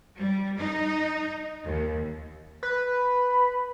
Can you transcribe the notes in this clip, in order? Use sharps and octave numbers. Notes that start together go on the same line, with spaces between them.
G3
D#4
D#2
B4